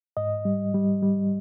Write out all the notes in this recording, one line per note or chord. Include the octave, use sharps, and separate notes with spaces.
G#2 D#5
G3
G3
G3